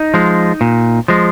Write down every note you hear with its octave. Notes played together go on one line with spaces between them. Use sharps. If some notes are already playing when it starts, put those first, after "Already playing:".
Already playing: D#4
F3 G#3
A#2
F3 G#3